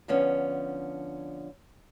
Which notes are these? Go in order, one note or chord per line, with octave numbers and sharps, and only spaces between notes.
D3 F3 B3 C#4 D4